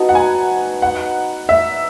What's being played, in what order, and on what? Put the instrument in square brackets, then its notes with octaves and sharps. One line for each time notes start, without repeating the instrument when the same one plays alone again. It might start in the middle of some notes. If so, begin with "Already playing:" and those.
Already playing: [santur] B3 D#4 F#4 [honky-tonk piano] A5
[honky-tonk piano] F#5
G#5
F#5
E5